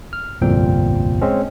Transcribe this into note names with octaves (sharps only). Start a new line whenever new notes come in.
F6
G1 C2 F2 A#2 C4 G5
G#3 C4 C#4